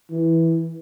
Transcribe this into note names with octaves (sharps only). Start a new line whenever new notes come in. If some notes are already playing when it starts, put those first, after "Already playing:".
E3